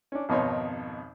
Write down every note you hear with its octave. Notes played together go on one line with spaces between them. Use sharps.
C#4 D4
G#1 F2 B2 D#4 C#5 C6